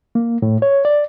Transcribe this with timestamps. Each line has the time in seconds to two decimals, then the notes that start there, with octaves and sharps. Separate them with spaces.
0.15 A#3
0.42 A2
0.62 C#5
0.85 D5